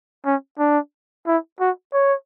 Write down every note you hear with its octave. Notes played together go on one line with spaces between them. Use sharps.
C#4
D4
E4
F#4
C#5